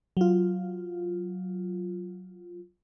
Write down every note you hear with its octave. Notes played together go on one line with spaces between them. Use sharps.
F#3 F4